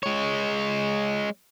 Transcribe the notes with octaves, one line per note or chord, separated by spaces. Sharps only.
G#3 C#5